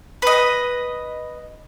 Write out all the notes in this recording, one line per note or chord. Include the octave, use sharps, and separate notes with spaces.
B4 D#5